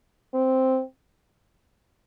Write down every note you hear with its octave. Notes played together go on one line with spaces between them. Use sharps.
C4